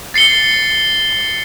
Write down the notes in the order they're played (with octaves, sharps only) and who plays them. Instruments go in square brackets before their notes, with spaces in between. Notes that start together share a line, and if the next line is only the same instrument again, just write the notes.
[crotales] A6 C7 C#7 G7